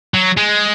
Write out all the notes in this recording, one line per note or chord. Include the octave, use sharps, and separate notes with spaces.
F#3
G#3